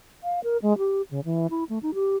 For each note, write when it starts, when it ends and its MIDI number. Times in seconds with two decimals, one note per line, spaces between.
0.24 0.40 77
0.44 0.57 70
0.62 0.77 56
0.78 1.02 67
1.11 1.24 49
1.25 1.47 52
1.51 1.64 64
1.69 1.79 57
1.83 1.94 63
1.94 2.16 67